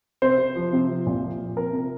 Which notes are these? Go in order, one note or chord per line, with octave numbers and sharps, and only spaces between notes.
C3 C5
C3
F3
C3
F3
A#2
F3
F3
C3 A#4
C3